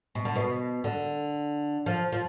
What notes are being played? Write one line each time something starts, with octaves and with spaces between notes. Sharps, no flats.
B2
D3
B2
D3
F3
F3